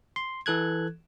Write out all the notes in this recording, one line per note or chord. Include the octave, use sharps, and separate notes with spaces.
C6
E3 A4 F#6 G#6